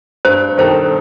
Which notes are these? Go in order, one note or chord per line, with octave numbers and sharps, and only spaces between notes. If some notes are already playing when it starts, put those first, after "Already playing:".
G2 C5
D#3 G3 D#4 A4 C5